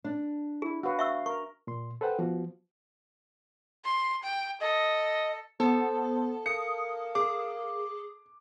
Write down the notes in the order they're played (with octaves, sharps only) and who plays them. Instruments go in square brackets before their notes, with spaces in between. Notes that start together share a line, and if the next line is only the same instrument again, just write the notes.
[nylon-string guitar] D4
[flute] E4 [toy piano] G#4
[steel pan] F#4 B4 [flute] F5
[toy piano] E5 C#6 E6
[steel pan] A#4 [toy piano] C#6
[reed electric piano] A#2 C6
A4 B4 C5 F#5 G5
F3 B3 F#4
[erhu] C6
G5
[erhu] A4 [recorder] D#5
[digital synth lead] B3 [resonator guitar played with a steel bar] A4 [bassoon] C5
[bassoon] A#3 [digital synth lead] D#6 [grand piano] C#7
[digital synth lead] G#4 [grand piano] D6